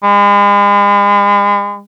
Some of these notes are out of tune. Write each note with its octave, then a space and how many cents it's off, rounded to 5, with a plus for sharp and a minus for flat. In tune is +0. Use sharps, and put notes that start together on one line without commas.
G#3 -40